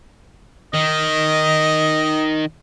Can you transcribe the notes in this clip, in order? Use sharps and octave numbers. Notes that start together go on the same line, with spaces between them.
D#3 D#5